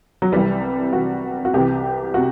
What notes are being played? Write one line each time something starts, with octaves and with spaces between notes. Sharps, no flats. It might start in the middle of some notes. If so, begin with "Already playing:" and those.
F#3
C2 C3 E3 G3
C2 C3 E3 F#4
F#4
C2 C3 E3 G4
C3 F#4